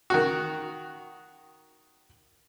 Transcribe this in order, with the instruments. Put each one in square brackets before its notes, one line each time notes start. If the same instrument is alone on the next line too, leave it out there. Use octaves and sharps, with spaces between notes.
[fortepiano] D#3 F#4